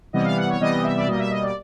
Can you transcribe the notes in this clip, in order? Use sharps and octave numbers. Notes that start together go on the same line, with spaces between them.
C3 E3 G3 B3 D#5
F5
F#5
C#5
C3 E3 G3 B3 D#5
E5
D5
B2 G3 A#3 D#5
E5
D#5
D5